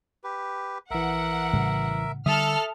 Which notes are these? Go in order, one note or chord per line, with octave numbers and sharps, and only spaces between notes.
G4 B4
A#1 E3 A#4 E5 F#5
A2 C#3 G3
D3 G3 A4 E5 D#6 F6